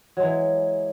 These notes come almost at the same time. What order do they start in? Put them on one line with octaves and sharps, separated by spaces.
F#3 G#3 E3